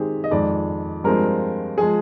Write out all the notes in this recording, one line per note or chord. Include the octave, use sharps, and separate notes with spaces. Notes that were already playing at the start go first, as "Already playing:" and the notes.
Already playing: D#3 G#3 C4 D#4 G4 G#4
D#5
F2 D#3 G#3 D5
G2 F3 G#3 C4 A#4
F3 G#3 G#4